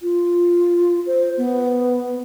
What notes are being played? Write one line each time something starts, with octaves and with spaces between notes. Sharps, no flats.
F4
C5
B3